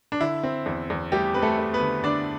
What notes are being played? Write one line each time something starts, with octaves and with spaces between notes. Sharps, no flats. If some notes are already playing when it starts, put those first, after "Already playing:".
D4
D3 E4
C4
E2
E2
G3 A3 G4
C4 B4
A3 A4
A3
B3 B4
D3
D3 D4 D5